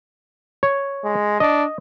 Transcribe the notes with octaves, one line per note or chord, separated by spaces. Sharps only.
C#5
G#3
D4 D#5